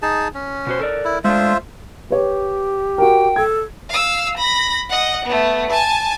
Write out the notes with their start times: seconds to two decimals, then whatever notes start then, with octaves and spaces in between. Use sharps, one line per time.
0.02 D#4 G#4 A5
0.34 C#4
0.67 B2 F#4 C5
0.79 A4 A#4 D5
1.05 E4
1.24 G#3 A3 D4 F4 C5 E5
2.10 G4 B4 C#5
2.98 F#4 A#4 G5
3.36 A4 G#6
3.89 F5 E6
4.37 B5 A#6
4.89 D#5 F#5
5.25 A3 B3
5.70 G#5 A5